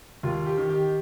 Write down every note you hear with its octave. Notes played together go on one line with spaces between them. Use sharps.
D#2 F4
G4
D#3
G4